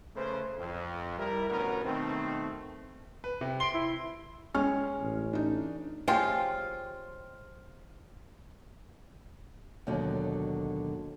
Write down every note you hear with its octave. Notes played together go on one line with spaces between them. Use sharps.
C#3 A3 B4 C5
F2
G3 E4 A#4
A1 D2 B2 B3 C#4 A#4
B2 D#3 A3 C4
B4
C3
C6 D7 G7
E4
G#3 C#4 F6
A1
D4 D#4
F3 G#3 F4 G4 C#5 G5
D#2 B2 D3 F#3